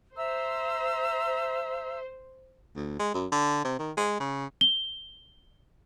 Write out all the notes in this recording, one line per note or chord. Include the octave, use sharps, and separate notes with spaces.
C5 E5 A#5 E6
D2
G#3
F#2
D3
C3
D#3
G#3
C#3
G7